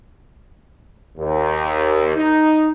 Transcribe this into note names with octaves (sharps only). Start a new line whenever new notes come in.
D#2
D#4